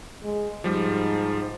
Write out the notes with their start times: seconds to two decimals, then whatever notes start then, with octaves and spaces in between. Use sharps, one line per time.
0.23 G#3
0.64 G#2 F3 G3